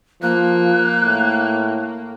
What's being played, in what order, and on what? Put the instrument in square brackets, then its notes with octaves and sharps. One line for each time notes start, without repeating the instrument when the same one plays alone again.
[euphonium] F3 [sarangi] A#3 [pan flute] F#6
[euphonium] A2